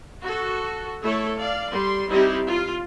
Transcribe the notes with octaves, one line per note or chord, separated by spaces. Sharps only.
F#4 A4
A3 E4 A4 C#5
D5 F5
G3 C6
G3 C4 D#4 E4 G4
F4